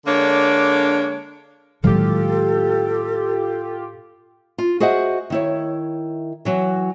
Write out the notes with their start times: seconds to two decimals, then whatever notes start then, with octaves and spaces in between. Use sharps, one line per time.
0.06 D3 G#3 A#3 D4 C#5
1.84 A2 D#3 F#3 G#3 A#3 F4 G4 A4
4.58 F4
4.80 F#4 G#4 C5 D#5 E5 F#5
5.30 D#3 E4 C#5
6.45 E3 F#3 F#4